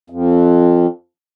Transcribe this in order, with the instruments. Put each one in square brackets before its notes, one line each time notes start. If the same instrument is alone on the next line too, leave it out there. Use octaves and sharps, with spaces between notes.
[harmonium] F2